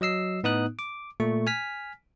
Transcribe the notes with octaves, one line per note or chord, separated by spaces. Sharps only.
F#3 D#5 E6 C7
A2 B3 D#4 D#6 F#6
D6
A#2 A3 C#6
G#5 F6 B6